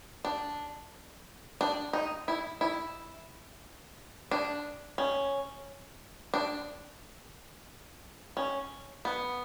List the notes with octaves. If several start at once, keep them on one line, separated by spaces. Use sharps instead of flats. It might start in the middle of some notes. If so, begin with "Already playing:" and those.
D4
D4
D#4
E4
E4
D4
C#4
D4
C#4
B3